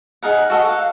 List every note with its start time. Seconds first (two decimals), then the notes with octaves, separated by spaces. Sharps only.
0.23 D#4 G#4 A#4 F#5
0.50 F#4 A4 D#5
0.65 F5 F#5